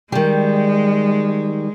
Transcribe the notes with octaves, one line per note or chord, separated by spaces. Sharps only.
D#3 G3 G#3